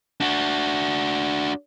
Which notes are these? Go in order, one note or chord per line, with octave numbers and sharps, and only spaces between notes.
D4 F#4